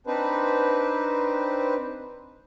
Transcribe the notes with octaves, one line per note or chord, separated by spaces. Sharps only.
C4 D4 D#4 B4 C5